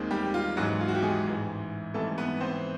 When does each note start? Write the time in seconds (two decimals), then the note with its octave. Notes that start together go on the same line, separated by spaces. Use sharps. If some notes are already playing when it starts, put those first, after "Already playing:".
Already playing: D#2 D#3 G#3 C4
0.11 G3 G4
0.34 F4
0.56 G#1 G#2 E3 F#3 G#3 C#4 F#4
0.81 F4
0.88 F#4
0.95 G4
1.03 G#3 G#4
1.26 A1 G#2 E3
1.94 G#1 G#2 E3 G3 A3 A4
2.18 B3 B4
2.40 C4 C5